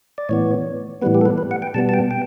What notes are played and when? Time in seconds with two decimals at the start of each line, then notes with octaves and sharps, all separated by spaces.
0.18 D5
0.29 A2 E3 B3 C#5
1.02 A2 E3 G3 B3 B4
1.14 G4
1.21 A4
1.26 B4
1.38 B4
1.51 F#5
1.62 G5
1.74 B2 G3 B3 A5
1.89 A5
1.94 G5
2.11 G5